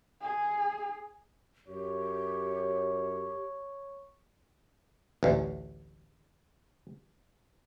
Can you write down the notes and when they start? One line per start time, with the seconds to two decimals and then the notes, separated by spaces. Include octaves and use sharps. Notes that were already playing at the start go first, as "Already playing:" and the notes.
0.21 G#4
1.68 F#2 G4 C#5
5.23 A1 D2